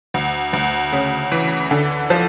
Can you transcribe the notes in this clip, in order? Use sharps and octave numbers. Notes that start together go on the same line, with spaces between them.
D2
D2
C#3
E3
D3
F3